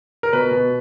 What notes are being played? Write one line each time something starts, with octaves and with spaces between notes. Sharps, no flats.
A#4
B2 B4
B2